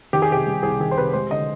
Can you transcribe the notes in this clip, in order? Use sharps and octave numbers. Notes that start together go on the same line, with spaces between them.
D#3 G4
G#4
C3 G4
G3
C2 G#4
D#3 G#4
C5
C3 B4
G#3 C5
D3 D#5